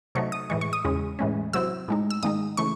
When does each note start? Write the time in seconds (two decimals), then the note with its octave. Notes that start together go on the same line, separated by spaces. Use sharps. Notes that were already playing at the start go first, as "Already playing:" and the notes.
0.15 C3 F#3 A3 D#4 C#6
0.32 D#6
0.50 A2 E3 G#3 C#6
0.61 C#6
0.73 D#6
0.85 E2 C#3 G#3 C#4
1.19 A2 E3 G#3 C#4
1.53 C3 F#3 C4 E4 E6
1.88 A2 G#3 D#4
2.10 E6
2.23 G#2 D#3 G#3 D#4 D#6
2.57 C#3 E3 A3 C#6